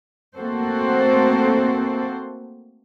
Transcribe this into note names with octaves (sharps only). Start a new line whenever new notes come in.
A3 A#3 C4 F#4 A4 C5